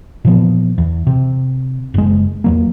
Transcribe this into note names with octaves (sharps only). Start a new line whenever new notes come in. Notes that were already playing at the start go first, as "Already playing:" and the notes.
A#2 E3 F3 B3
E2
C3
F#1 G#3
E2 F#3 A#3